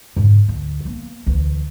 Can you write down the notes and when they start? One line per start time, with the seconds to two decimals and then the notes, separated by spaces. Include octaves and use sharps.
0.16 G#2 C#3
0.48 D2
0.85 A#3 B3
1.26 D2 E3